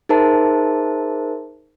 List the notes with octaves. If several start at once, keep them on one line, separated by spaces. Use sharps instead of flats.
D#4 G#4 A#4 C5 E5 A5